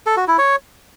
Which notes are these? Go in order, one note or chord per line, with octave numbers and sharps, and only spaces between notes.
A4
F#4
E4
C#5